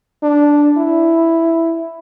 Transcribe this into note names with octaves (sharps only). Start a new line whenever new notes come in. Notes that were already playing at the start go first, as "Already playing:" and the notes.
D4
E4